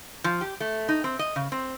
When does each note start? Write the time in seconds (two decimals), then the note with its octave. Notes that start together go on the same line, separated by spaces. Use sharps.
0.24 F3
0.41 G4
0.60 A3
0.88 D#4
1.04 C4
1.19 D#5
1.36 C#3
1.52 C4